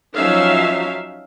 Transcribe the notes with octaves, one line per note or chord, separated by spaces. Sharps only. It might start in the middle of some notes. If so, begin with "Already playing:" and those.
F3 F#3 C#4 D#4 E5 F5